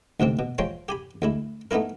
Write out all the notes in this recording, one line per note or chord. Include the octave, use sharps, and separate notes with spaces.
D2 G#2 C3 C4
B2
F3 G#3 C#5 G5 C6
G4 G#5 B5
D2 G#3 E4
A3 B3 D#4 E4 A#4